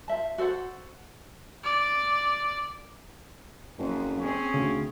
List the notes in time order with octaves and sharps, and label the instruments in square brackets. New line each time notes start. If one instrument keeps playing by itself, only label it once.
[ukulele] F4 C5 E5 A5
F#4 A4 C5 F#5
[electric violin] D5
[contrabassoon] F#1 [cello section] F2
[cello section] C4 G#4 [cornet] C#4
[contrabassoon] D2 [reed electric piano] C#3